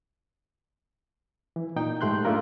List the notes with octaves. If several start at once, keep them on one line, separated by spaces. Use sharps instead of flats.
E3
A#2 D#4 G5
G#2 A3 G4 C6 F#6 G6
A3 A#3 D4 F4 A#4